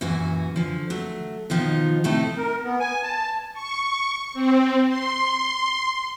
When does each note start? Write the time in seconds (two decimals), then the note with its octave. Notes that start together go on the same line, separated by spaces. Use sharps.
0.01 F#2 A#2 E3 F#4 G#5
0.56 D3 F3
0.90 F#3 A3
1.50 B2 D#3 F3 D#4 F4
2.04 A2 C3 A3 D#4 E4 A5
2.35 A#4
2.63 B3
2.80 G#5
3.03 A5
3.53 C#6
4.34 C4
4.89 C6